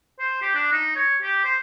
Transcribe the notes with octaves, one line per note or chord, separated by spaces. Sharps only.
C5
G4
D4
D#4
C#5
G4
C5